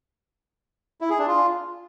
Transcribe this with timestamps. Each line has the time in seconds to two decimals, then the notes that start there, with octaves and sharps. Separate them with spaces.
1.01 E4
1.10 G#4
1.18 D4
1.27 F4